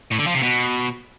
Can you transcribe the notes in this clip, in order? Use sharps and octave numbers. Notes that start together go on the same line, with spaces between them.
A2
D3
F3
C3
B2